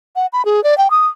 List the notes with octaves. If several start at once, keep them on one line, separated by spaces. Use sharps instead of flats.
F#5
B5
G#4
D5
G5
D#6